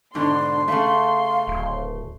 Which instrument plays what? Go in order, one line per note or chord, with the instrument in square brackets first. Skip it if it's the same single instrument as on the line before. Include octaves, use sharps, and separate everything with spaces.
[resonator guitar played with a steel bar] G#2 B2 D3 [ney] D4 [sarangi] C6
[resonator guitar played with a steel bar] C#3 A3 [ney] F5
[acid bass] D1